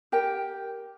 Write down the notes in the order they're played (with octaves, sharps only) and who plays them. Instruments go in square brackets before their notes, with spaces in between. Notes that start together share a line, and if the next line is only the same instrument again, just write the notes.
[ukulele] G4 A#4 G5